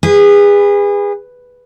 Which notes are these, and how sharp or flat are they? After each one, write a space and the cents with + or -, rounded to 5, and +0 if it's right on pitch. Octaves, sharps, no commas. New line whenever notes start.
G#4 -30 B4 +0